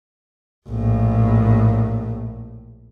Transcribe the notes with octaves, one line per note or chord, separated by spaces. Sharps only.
A#1 A2